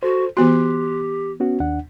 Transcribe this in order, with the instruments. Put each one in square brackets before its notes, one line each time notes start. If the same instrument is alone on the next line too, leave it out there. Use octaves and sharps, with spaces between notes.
[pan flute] F#4 [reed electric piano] A4 C5
[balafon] E3 B3 F#4 [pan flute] G4 [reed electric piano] C6 F#6
[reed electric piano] B3 C#4 F#4
D#2 D4 F#5